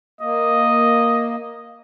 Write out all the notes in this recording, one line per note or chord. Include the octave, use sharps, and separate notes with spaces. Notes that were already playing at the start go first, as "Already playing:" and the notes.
A#3 D#5